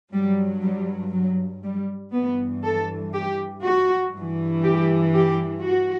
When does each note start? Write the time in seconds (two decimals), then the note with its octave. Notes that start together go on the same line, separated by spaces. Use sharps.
0.13 G2 F#3 G3
0.63 G3
1.12 F#3
1.63 G3
2.13 G2 E3 B3
2.63 A4
3.13 G4
3.63 F#4
4.13 G2 E3
4.63 G4
5.13 G4
5.63 F#4